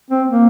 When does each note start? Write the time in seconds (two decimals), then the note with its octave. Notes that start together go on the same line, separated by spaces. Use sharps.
0.11 C4
0.28 A#3